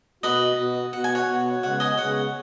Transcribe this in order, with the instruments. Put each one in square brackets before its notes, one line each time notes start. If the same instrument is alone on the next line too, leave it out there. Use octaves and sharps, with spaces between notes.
[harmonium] B2 B3 F#4 [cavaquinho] B4 D#5
[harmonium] B2 B3 F#4
[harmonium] B2 B3 F#4 [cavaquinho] F#5
[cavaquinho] G#5
C#5 F#5
[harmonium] B2 B3 F#4
[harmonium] C#3 G#3 B3 [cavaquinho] C#5 F#5
[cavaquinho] D#5 G#5
[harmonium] C#3 G#3 B3 [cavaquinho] C#5 F#5